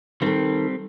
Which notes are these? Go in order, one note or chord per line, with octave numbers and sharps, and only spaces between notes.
D#3 G3 C4 A4